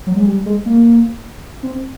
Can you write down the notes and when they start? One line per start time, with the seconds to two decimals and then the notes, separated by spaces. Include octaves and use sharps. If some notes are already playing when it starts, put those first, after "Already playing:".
0.07 F#3
0.16 G#3
0.26 G3
0.46 G#3
0.66 A#3
1.63 C4